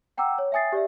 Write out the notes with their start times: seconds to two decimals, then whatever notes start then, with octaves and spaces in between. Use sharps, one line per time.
0.17 F#5 G5 A#5 D6 E6
0.38 C#5
0.52 E5 G5 G#5 D#6 A6 C7
0.73 G4 D5 E5